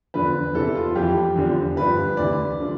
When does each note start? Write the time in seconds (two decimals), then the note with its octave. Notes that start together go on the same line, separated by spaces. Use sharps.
0.14 E2 D3 F3 B4
0.55 E2 C3 E3 A4
0.75 F4
0.95 F2 E3 G4
1.36 E2 D3 F3
1.77 G2 D3 F3 B4
2.17 D2 C3 E3 D5
2.60 D3 F3